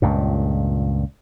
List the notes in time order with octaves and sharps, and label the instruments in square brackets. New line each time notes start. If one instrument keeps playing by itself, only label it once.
[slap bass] C#2 G2 A#2